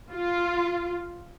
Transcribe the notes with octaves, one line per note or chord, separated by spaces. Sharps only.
F4